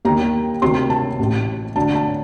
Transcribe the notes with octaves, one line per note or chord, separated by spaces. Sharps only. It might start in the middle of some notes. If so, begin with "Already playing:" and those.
D#2 D#3 A#5
D2 C3 D#3 C6
A5
A1 A2
D2 D3 A5
A5